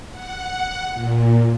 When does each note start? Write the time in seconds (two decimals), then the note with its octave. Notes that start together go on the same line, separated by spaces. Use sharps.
0.10 F#5
0.92 A#2